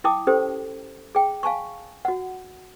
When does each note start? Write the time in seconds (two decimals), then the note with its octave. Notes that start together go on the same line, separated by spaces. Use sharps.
0.04 E4 G5 A5 D6 D#6
0.27 C#4 G4 A4 C5
1.15 G#4 G5
1.43 F5 G#5 A5 C#6
2.05 F#4 F#5